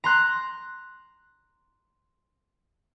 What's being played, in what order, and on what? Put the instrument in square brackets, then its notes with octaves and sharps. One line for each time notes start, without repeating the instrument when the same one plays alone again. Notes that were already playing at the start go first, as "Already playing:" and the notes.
[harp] A#5 C6 F#6